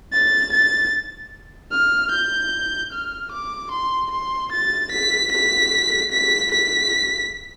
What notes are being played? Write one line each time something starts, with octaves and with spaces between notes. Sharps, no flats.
A6
A6
F6
G6
F6
D6
C6
C6
A6
B6
B6
B6
B6